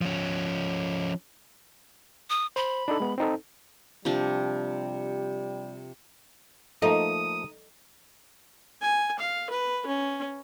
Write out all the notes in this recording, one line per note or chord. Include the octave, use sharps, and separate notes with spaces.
F3 C#4
D#6
C5 B5
D4 D#4 A4
G#3 B3
C4 D#4 A4
C3 F3 G3 D4
F3 A3 A#3 D#4 A4 D#6
G#5
F5
B4
C#4